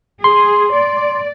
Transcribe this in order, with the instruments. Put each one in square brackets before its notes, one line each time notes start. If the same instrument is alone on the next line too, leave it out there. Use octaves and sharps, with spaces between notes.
[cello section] G#4 [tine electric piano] C6
[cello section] D5